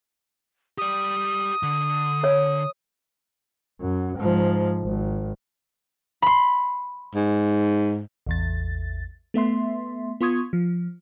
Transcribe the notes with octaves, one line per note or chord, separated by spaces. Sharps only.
G4 D5 D#6
D3
A#4 C#5
F#2
G#2 F3
G#1
B5 C6
G#2
A1 E2 A6
A3 B3 E5 C6
B3 F4 C6 C#6 D#6 G#6
F3